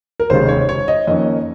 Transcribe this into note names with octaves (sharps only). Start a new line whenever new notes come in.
A#4
F1 D#2 C#3 G#3 C5
C#5
C#5
D#5
F2 D#3 A#3 C#4 D#5